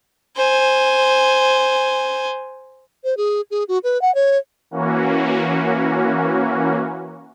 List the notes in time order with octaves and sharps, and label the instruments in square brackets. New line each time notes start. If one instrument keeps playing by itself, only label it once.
[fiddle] C5 G#5
[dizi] C5
G#4
G#4
F#4
B4
F#5
C#5
[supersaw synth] E3 A#3 C#4 F#4